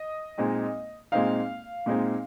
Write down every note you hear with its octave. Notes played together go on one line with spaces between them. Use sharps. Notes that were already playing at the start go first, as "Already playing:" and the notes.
Already playing: D#5
A#2 G#3 C4 D#4
A#2 G#3 C4 D#4 F5
A#2 G#3 C4 D#4